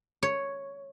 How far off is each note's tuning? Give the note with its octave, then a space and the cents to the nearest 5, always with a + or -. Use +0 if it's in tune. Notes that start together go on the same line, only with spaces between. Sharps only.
C#5 +0